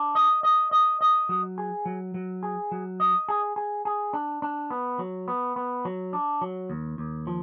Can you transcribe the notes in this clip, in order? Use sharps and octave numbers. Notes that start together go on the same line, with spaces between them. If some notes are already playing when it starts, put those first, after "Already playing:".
Already playing: D4
D#5
D#5
D#5
D#5
F#3
G#4
F#3
F#3
G#4
F#3
D#5
G#4
G#4
G#4
D4
D4
B3
F#3
B3
B3
F#3
D4
F#3
D#2
D#2
F3